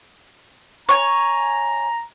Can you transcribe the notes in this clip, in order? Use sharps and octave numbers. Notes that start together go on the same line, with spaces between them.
C#5 G#5 A#5